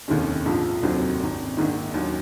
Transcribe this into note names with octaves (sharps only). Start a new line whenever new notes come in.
F1 D#2 D#3 G#3 C#4
A#1 G#2 F3
F1 D#2 D#3 F#3 C4
G#1 F#2 D#3
A#1 G#2 D#3 A#3
D#2 D#3 F#3 C#4